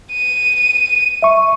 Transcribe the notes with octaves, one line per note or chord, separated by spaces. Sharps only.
D#7
E5 C#6